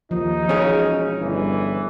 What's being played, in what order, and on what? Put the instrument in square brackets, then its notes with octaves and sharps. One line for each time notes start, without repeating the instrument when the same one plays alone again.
[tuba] D#2 [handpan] F3 [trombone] D#4
[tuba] E1 [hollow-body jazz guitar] C#4 G#4
[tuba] G1 [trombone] E3